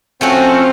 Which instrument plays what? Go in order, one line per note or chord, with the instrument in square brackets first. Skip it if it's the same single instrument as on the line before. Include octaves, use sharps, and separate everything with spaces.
[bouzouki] F3 A3 C#4 F#4 [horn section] C4